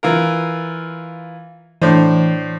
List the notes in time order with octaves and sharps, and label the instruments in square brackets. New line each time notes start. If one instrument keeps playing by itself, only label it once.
[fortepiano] E3 F4 A#4
[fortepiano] A2 D4 C5 [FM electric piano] E3